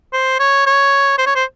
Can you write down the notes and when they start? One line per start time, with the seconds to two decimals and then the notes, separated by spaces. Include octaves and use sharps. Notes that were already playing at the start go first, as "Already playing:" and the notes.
0.13 C5
0.39 C#5
0.66 C#5
1.18 C5
1.26 C#5
1.35 C5